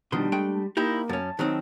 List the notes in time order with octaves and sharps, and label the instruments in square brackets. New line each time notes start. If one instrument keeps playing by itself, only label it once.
[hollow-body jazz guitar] B2 D#3 F3 [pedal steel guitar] G3 C6 [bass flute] D4
[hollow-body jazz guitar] G#3 A3 G5
[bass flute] A#3 [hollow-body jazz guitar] D#4 E4 G4 [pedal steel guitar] C5 D#5
[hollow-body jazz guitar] F#2 C#4 [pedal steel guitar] A5
[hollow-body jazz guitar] D#3 F#3 C4 [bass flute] D#4